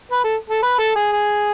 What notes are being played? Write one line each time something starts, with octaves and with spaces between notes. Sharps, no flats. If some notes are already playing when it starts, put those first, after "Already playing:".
B4
A4
A4
B4
A4
G#4
G#4